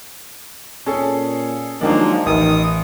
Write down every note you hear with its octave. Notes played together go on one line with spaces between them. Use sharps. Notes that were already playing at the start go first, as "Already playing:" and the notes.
A#2 C#4 G#4 A4
D#3 F3 F#3 G#3 A#3 D4
A1 D#3 D#6